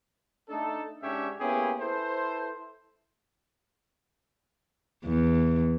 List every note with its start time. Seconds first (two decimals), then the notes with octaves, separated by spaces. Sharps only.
0.49 A3 D4 D#4 A4
1.01 G#2 C#4 D4 G4 C#5 E5
1.41 A#3 B3 C#4 E4 G4 G#4
1.80 E4 A4 B4 C5
5.05 E2